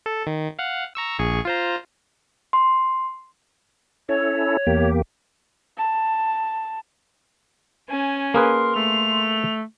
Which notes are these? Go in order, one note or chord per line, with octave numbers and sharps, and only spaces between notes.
A4
D#3
F5 F#5
A#5 C#6 E6
A#1 G#4 C#6
F4 C5 A#5
C6
C#4 E4 A4 C#5
E2 A#3 G4
A5
C#4 G#5
A#3 G#4 A#4 B4 C6
A3 F7